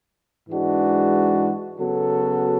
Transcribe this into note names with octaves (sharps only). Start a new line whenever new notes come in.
G#2 E3 G#3 D4 F#4
C#3 F#3 B3 F#4 A4